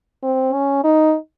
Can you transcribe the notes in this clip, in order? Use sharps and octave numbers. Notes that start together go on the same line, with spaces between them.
C4
C#4
D#4